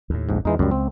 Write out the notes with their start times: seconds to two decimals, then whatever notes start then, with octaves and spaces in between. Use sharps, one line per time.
0.10 D#2 A2
0.29 A#1 G#2
0.45 E2 E3 G#3 D#4
0.59 C#2 F#2 G3
0.71 C4